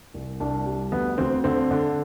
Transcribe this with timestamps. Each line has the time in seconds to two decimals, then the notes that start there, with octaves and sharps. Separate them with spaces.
0.14 C2
0.40 C2 D4
0.66 G3
0.92 D2 B3
1.18 D2 C4
1.44 D3 C4
1.71 D3